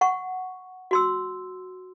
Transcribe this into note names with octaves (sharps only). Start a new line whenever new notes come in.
F#5 C#6
F#4 C6 E6